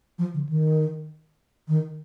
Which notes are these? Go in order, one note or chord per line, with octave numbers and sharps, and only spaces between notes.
F3
D3
D#3
D#3